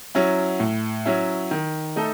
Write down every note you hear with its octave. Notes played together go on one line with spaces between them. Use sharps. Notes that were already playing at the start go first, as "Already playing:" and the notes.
F#3 C#4 E4
A2
F#3 C#4 E4
D#3
A3 D#4 A4